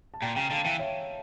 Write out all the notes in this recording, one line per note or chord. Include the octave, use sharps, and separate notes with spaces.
A5
A#2 G5 A#5
C#3 G5 A#5
D3 F5 A5
E3 E5 G5
C#5 E5